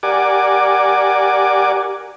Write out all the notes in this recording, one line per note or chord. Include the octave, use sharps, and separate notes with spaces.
G4 A#4 D5 F#5 G#5 D6